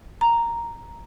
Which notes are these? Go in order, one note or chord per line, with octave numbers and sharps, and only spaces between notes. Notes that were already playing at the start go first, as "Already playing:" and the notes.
A#5